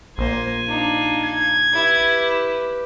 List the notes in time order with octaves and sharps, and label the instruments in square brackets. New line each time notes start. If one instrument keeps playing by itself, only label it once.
[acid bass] A#1 [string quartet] A#3 C5 [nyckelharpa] G#5
[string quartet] D4 D#4 F5
[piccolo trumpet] G#6
[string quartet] E4 [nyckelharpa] G4 B4